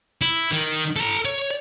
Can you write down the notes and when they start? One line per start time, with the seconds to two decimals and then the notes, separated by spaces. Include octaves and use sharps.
0.21 E4
0.51 D#3
0.96 A4 A#5
1.25 C#5